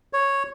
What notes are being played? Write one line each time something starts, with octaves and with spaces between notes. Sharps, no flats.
C#5